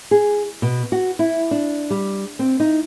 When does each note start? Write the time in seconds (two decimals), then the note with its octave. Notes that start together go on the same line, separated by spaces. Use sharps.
0.11 G#4
0.62 B2
0.92 F#4
1.19 E4
1.51 D4
1.90 G3
2.39 C4
2.60 D#4